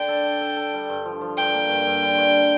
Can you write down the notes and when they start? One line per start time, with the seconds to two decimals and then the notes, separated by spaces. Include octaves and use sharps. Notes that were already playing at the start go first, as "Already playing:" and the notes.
Already playing: D3 D4 G5
0.08 A4
0.24 A4
0.41 A4
0.57 A4
0.74 G3
0.90 G2
1.05 F3
1.21 F3
1.37 G2 G5
1.54 A#3
1.70 G2
1.87 G2
2.03 D3
2.18 G2